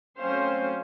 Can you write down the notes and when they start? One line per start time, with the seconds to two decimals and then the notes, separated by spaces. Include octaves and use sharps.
0.17 F#3 A3 C4 C#4 C5 F5